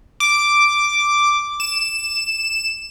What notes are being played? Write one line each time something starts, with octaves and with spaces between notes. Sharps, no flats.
D6
E7